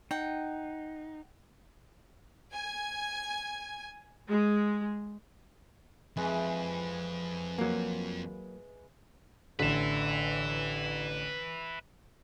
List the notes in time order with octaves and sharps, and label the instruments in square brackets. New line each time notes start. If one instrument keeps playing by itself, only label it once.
[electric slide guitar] D#4 [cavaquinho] F#5 G5
[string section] G#5
G#3
[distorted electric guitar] F2 [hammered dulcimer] E3 G#3
[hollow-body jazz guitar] F#3 A#3
[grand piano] A1 D3 [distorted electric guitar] B4 E5